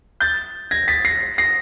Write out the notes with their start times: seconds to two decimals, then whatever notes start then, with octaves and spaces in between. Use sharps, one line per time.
0.20 G6 A6
0.71 G#6 A#6
0.88 A6 B6
1.05 A#6 C7
1.38 A#6 C7